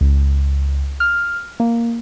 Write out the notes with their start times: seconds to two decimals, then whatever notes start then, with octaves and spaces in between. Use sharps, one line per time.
0.01 C#2
1.00 F6
1.60 A#3